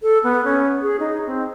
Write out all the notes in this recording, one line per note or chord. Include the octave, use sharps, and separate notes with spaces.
A4
B3
C#4
G#4
D#4
C4